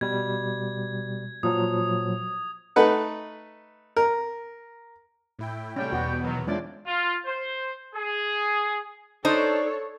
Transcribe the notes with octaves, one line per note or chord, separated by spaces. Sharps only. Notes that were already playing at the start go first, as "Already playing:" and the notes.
B2 G3 G#6
A#2 F3 F#3 D#6
A3 D#4 B4 F#5
A#4
A2 E4 G5
C3 G3 A3 C#4 G5
E2 B2 B3 F#4
D#3 F#3
G#3 C#4 D4 E4 F4 C5 D5
F4
C5
G#4
D4 D#4 A4 C5 C#5